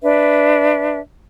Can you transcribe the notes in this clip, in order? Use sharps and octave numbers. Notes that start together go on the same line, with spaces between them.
D4 B4 E5